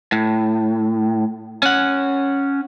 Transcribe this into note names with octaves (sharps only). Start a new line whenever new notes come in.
A2
C#4 F#5